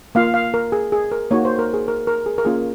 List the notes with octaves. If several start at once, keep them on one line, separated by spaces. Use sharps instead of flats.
A#3 F4 F5
F5
A#4
G#4
G#4
A#4
A#3 D#4 F#4 C#5
C5
A#4
G#4
A#4
A#4
G#4
A#4
A#3 C#4 F4 G#4